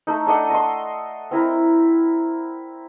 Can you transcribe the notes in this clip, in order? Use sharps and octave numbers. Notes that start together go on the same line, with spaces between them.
A3 D#4
D4 A4 D#5 F#5
D#5 C6
C4 E4 A#4